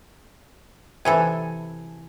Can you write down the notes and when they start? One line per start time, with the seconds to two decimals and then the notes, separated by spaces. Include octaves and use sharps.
1.05 C3 E3 A4 G#5